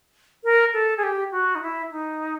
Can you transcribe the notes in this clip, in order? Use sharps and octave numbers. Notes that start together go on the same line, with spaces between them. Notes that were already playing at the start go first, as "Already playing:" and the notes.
A#4
A4
G#4
G4
F#4
D#4
E4
D#4